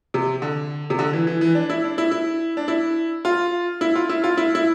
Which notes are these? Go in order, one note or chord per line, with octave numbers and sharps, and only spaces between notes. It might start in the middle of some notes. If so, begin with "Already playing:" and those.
C3
D3
C3
D3
E3
E3
E3
D4
E4
D4
E4
E4
D4
E4
F4
E4
F4
E4
F4
E4
E4